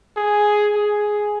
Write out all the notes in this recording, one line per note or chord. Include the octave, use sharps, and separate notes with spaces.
G#4
G#4